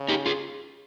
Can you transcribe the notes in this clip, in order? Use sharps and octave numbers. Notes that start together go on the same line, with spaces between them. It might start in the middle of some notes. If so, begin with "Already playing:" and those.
Already playing: C#3
D#4 G4
F4 G#4